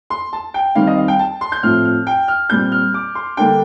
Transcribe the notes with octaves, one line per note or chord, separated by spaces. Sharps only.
C6
A5
G5
D#3 G3 C4 F5
D#5
F5
G5
A5
C6
G6
A2 F3 C4 F6
F6
G5
F6
A#2 G3 C4 G6
F6
D6
C6
D3 G3 A#3 D4 G5